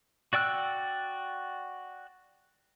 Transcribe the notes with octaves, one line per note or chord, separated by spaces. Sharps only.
F#4 D5 G5 E6 F#6